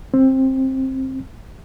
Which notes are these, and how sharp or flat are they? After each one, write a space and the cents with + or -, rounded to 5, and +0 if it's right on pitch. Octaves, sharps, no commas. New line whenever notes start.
C4 +15